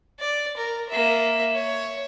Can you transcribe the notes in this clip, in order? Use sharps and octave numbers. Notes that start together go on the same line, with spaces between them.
D5
A#4
A#3 E5
C#5